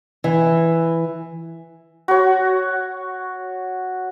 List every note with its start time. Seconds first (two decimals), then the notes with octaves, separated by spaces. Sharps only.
0.24 E3
2.08 F#4 C#5